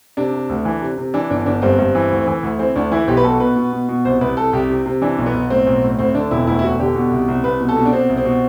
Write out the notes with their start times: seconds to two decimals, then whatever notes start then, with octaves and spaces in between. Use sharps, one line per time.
0.17 C3 D4
0.33 C3
0.49 D2
0.65 E3
0.82 C3
0.97 C3
1.14 E3 D4
1.30 G1 D4
1.46 G1 D4
1.62 G2 C4
1.79 G2
1.95 E3
2.11 D2
2.27 E3
2.43 D2
2.59 E3 C4
2.75 D2 D4
2.91 E3 E4
3.07 B1 G4
3.17 B4
3.24 B2 A4
3.40 B2 B4
3.56 B2
3.72 B2
3.89 B2
4.05 C2 C5
4.21 C2 B4
4.37 C2 A4
4.53 C2 G4
4.70 C3
4.86 C3
5.02 E3 D4
5.18 B1
5.26 B3
5.34 B1
5.50 A2 C4
5.66 B1
5.83 A2
5.99 D2 C4
6.15 D3 D4
6.31 E1 E4
6.47 D2 E4
6.59 E4
6.63 E1 F#4
6.79 D3 G4
6.95 B2
7.12 C2
7.28 C2
7.44 C2 B4
7.60 B2
7.69 A4
7.77 B2
7.85 D4
7.93 B2 C4
8.09 C2
8.17 C4
8.25 B2